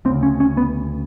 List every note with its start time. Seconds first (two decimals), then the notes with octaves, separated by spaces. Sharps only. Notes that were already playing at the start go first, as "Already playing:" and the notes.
0.05 D2 C4
0.09 C#3
0.23 C#4
0.40 C#4
0.57 B3